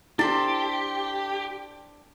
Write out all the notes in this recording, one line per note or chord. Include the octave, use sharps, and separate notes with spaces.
D4 E4 G4 A4 C5